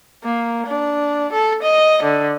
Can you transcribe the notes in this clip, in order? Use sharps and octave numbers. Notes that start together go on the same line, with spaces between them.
A#3
D4
A4
D#5
D3